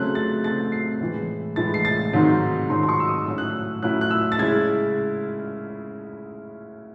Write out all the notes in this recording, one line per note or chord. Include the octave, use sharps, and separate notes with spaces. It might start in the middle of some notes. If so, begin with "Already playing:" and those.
Already playing: C#3 F#3 A3 C4 F#6
A6
C#3 F#3 A3 C4 A6
C7
A2 E3 G#3
A2 E3 G#3 A6
C7
A6
G#2 D#3 F#3 C4 D#4
G#2 D#3 F#3 C4 D#4 C6
C6
C#6
E6
D#6
A2 F#3 C#4 E4 E6
F#6
E6
A2 F#3 C#4 E4 F#6
F#6
E6
A6
C#3 G#3 C#4 E4 G#6